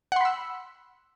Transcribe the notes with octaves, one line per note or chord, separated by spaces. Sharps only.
F#5 B5 C6 E6